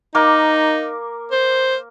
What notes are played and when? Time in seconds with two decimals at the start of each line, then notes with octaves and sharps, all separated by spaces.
0.15 A#3 D#4 A#4 D6
1.32 C5